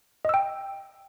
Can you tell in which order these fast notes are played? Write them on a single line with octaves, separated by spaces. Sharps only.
D#5 E6 G5